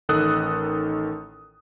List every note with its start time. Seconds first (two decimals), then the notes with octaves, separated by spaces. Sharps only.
0.09 A1 D#3 A4 D#6 F#6